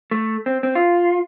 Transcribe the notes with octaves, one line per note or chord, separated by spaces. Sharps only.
A3
C4
C4
F4